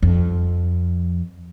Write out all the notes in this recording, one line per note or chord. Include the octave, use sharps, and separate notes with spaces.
F2